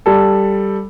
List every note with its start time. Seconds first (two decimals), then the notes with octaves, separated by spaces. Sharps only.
0.06 G3 A4